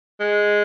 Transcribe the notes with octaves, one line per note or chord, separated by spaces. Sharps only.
G#3